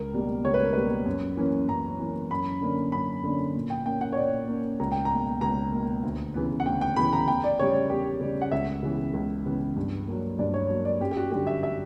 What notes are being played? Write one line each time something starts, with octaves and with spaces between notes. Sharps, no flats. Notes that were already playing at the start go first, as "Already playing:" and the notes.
Already playing: C#2 A#4
B2 G3 A#3
C#2 C#5
B4
A#4
B2 G3 A#3 B4
F#2
E3 A#3 C#4
F#2 A#5
E3 A#3 C#4
F#2 B5
D3 A#3 C#4
F#2 B5
D3 A#3 C#4
A#2
G5
A#3 C#4 G5
F#5
C#5
A#2 D5
A#3 C#4
C#2 A#5
G5
A#5
B2 A#3
C#2 A#5
B2 A#3
D2
C#3 E3 B3
F#5
D2 G5
G5
C#3 E3 B3 B5
A#5
E2 G5
D5
C#3 G3 C#5
E2 G4
C#3 G3
F#5
C#2 E5
C#3 E3 B3
C#2
C#3 E3 B3
G2
F#3 A#3
G2 D5
C#5
F#3 A#3
D5
F#2 G4
G4
F#4
D3 G3 G4
E5
E5